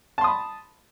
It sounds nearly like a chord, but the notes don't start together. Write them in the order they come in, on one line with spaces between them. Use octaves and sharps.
A5 C6 D#6 B5